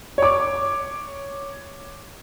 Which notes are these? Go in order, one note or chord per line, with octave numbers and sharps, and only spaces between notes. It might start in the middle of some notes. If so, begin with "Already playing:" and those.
C#5 D6